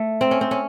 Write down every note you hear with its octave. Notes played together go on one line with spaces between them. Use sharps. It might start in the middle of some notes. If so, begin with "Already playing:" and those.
Already playing: A3
C4
C#4
C4
C#4